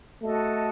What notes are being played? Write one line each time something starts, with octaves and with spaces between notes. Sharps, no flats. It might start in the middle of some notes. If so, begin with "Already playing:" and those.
A3 F#4 A4 D#5 A5